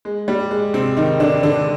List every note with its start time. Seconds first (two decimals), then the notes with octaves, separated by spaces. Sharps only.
0.05 G#3
0.28 G3
0.51 G#3
0.74 C3 C4
0.97 D#3 D#4
1.20 D3 D4
1.43 D3 D4